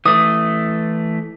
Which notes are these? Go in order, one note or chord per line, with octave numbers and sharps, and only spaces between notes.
E3 A3 D#6